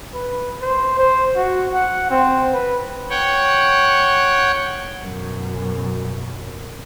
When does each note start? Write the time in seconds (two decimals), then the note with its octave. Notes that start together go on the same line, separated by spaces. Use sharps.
0.14 B4
0.62 C5
0.98 C5
1.36 F#4
1.74 F#5
2.10 C4
2.53 B4
3.10 C#5 F#5 G5
5.03 F#2 B2